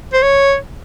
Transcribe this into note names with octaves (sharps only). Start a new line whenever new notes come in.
C5
C#5